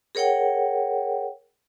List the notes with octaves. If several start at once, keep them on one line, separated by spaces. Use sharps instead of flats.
G#4 A#4 C#5 F#5 G5